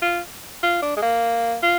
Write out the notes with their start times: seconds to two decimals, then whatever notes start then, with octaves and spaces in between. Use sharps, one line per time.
0.02 F4
0.63 F4
0.82 D4
0.97 G#3
1.02 A#3
1.62 F4